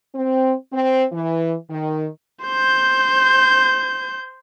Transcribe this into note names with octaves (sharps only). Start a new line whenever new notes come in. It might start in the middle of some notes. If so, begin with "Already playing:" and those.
C4
C4
E3
D#3
C5 G6